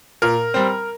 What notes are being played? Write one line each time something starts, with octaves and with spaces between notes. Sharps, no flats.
A#2 A#4
G3 C4